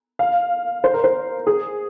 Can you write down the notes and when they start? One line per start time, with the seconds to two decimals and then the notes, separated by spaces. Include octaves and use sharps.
0.19 F5
0.84 C5
0.94 A#4
1.04 C5
1.47 G#4